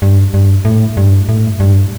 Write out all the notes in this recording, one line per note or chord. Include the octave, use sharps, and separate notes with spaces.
G2
G2
A2
G2
A2
G2